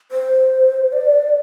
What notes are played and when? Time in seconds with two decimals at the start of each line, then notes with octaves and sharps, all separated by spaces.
0.12 C5
0.93 D5